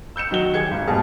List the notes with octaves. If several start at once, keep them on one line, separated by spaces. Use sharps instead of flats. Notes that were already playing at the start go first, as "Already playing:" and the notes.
E6 G6 C#7 E7
D#3 F#3 G7
G4 G#4 G#6 C#7
G#1
G1 B2 G3 G#4 A5 F6